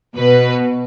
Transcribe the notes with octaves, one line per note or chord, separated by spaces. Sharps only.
B2 B4